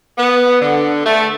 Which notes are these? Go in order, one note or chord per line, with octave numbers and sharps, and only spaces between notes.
B3
D3
A3